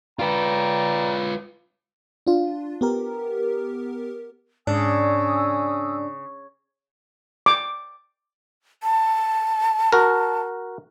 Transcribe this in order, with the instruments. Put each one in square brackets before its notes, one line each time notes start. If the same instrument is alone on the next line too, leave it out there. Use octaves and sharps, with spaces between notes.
[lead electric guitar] F4 B4 [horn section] D5 G5 A#5
[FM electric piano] D4 F4
B3 G4 A#4
[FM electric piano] G#2 D5 [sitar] C#3 [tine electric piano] D4 [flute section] G#5 D#6 E6
[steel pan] D6
[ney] A5
[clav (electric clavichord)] F#4 A#4